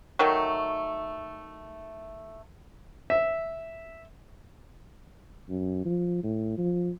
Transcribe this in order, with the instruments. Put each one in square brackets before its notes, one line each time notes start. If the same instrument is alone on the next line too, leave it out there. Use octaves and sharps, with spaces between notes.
[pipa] D#3 F#3 A3
[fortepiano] E5
[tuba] F#2
F3
A2
F3